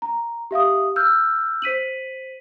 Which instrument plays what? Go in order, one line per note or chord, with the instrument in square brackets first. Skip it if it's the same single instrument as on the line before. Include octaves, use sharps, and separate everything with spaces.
[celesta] A#5
G4 E5 F5 D#6
E6 F6 G6
C5 B6 D#7 F#7